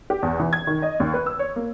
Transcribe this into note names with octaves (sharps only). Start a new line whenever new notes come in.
G4
E2
E3
G#6
D#3
D#5
D#2
B4
E6
C#5
A#3